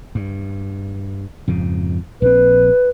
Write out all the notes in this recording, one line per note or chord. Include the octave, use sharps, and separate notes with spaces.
G2
F2 G#2 C#3
A#1 C4 B4